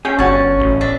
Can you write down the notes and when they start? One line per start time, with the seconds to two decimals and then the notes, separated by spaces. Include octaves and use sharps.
0.05 C#4 G#4 G5
0.19 G1 C#4 F#4 C#5 A5
0.60 A1
0.81 D4 E5